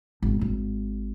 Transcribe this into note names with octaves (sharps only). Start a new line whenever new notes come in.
G#1
G#1